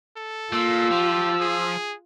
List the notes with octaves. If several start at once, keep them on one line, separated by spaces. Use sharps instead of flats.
A4
A#2 F4 E6
F3 G4
G#4